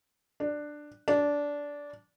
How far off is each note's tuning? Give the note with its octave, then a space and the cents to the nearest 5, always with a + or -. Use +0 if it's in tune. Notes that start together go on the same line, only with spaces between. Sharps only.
D4 +10
D4 -15